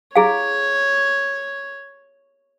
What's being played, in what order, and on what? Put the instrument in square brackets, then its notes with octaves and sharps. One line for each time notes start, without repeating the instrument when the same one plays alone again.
[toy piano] E4 G#4 F5 [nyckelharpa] C#5